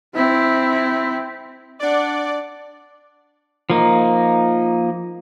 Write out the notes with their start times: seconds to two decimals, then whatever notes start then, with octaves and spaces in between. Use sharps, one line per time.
0.14 C4 E4
1.80 D4 D5 F#5
3.70 F3 A#3 D#4